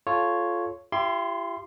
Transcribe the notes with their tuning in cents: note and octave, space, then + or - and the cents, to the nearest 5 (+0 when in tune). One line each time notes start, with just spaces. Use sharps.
F4 +0 A4 -15 C#5 +0
E4 +45 G4 -5 C6 +0